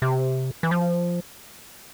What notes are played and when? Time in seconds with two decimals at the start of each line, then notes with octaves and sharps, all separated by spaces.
0.02 C3
0.63 E3
0.71 F3